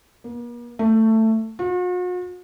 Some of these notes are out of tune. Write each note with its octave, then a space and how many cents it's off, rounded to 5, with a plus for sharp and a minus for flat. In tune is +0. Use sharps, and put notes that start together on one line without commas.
A#3 +45
A3 +15
F#4 -45